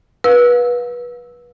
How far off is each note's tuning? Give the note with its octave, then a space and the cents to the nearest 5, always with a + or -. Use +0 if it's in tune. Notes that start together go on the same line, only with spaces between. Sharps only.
B4 -25 F5 +40 E6 -5